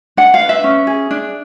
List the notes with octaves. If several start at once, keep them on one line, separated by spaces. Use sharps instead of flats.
D4 F#5
F5
B4
E5
C#4
G#4
D4